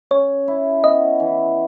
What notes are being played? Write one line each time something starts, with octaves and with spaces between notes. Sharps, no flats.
C#4 C#5
E4
B3 D#5
E3